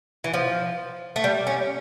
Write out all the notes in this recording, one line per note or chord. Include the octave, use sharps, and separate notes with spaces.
E3
F3
A3
G3
C#4